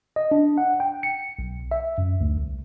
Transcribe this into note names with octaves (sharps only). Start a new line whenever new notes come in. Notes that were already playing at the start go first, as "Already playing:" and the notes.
D#5
D4
F#5
G5
C#7
B1
E5
F#2
D2
C2